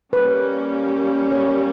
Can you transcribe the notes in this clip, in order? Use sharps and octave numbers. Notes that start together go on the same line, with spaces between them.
G3 A#3 C#4 B4
C#5